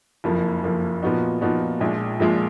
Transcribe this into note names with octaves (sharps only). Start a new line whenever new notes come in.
F#1 F2 F3 A#3
F#1 F2 F3 A#3
A#2 F3 B3 D#4 F#4
A#2 F3 B3 D#4 F#4
A#1 A#2 F3 G#3
A#1 A#2 F3 G#3